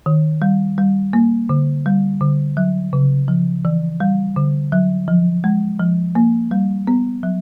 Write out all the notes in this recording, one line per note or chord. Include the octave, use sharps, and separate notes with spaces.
D#3
G3
G3
A#3
D3
G3
D3
F#3
C#3
F3
E3
G3
D3
F#3
F3
G#3
F3
A#3
G3
B3
F#3